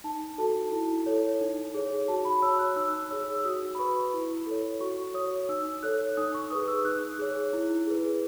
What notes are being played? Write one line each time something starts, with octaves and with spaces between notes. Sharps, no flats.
D#4 A5
F#4 A4 A5
E4
A4 C#5
D#4
G#4 C#5
F#4 A5
B5
C#5 E6
F#6
D#4 E6
G#4 C#5 E6
E6
F#4 D#6
B5
B4 C#6
E4
A4 C#5
F#4 C#6
C#5 D#6
D#4 E6
A4 C#5 F#6
D#4 D#6
C#6
G#4 B4 D#6
E6
D#4 F#6
G#4 C#5
E4
G#4 B4